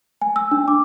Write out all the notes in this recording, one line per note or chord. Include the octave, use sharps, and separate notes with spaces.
G#5
E6
D4
D6